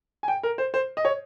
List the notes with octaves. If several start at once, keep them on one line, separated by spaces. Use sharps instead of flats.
G#5
G5
A#4
C5
C5
D#5
C#5